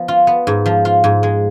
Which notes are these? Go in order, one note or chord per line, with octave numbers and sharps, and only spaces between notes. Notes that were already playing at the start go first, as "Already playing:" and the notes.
Already playing: F3 B3
F4
B3
G#2
F3
F4
G#2
G#3